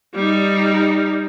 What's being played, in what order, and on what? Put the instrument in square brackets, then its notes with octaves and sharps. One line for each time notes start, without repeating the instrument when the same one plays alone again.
[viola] G3 D#4